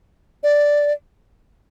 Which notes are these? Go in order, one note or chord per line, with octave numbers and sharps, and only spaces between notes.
D5